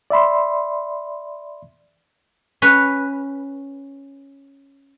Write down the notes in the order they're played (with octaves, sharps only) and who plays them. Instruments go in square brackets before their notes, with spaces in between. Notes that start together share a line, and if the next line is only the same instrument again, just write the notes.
[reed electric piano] D5 E5 B5 C6
[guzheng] C#4 B4